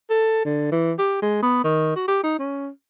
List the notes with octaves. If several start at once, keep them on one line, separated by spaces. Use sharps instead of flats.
A4
D3
E3
G4
G#3
B3
D#3
F#4
G4
D#4
C#4